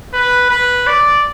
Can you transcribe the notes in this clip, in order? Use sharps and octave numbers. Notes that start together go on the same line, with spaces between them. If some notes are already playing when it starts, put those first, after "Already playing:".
B4
B4
D5